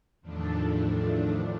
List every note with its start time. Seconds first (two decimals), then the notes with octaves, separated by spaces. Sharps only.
0.21 E2 A2 D#3 F3 A3 D4